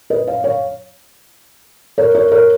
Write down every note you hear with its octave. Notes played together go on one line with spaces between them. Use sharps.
B4 D#5
C#5 F5
C#5 F5
A#4 C#5
A#4 C#5
A#4 C#5